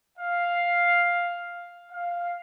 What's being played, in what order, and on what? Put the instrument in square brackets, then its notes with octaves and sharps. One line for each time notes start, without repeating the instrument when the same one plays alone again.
[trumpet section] F5
F5